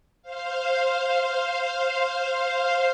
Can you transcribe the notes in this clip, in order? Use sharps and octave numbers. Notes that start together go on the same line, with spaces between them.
C5 F5